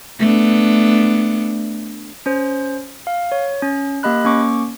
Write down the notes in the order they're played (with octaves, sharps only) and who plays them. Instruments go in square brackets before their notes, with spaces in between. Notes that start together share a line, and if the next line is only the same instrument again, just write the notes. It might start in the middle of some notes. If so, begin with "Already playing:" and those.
[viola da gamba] A3 B3 D4
[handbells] C#4 C5
F5
C#5
C#4
A#3 G4 D#5 B5 F#6
A#3 C#4 C#6 D6